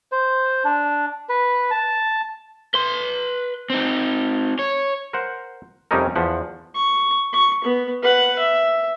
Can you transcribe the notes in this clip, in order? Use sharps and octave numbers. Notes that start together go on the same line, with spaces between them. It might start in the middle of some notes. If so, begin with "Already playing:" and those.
C5
D4
B4
A5
B4 C6
C4 D#4
C#5
A#4 C5 F#5
F2 C3 G3 C#4 D#4 A#4
E2 F3 F#5
C#6
C#6
B3
B4 F#5
E5